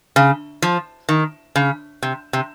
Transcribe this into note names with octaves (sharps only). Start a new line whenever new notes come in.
C#3
F3
D#3
C#3
C3
C3